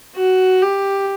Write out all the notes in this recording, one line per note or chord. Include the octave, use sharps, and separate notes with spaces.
F#4
G4